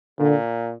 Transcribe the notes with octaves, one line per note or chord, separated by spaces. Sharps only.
A#2 D3